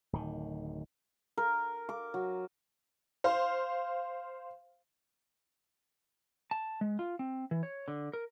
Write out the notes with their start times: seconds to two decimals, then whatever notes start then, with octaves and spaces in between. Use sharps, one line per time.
0.13 D1 D#3
1.38 A#4
1.89 D6
2.14 F#3
3.24 C5 F5
6.51 A5
6.81 G#3
6.99 F4
7.19 C4
7.51 E3
7.63 C#5
7.88 D3
8.13 A#4